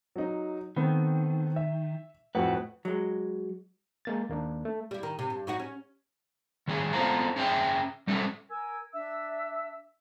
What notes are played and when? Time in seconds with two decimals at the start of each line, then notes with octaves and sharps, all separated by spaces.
0.16 F#3 D#4
0.76 D#3 A3 B3 C4
1.56 E5
2.35 F2 A2 F#4 B4 F#5
2.85 F#3 G#3
4.05 G#3 A#3 A6
4.29 D#2 A#3 D4
4.65 A3
4.91 G3 E4
5.03 D#3
5.19 C3
5.30 G2
5.47 F#3 D#4 F#4
5.60 C#4
6.68 D#3 F#3 F#4 G#4
6.93 B3 F4 A4 C5 F5 A#5
7.36 C#4 G#4 C#5 E5 G5
8.07 G3 A3 C#4 F#4 A4
8.48 A#4 G#5 E6 G#6
8.93 D4 E5 E6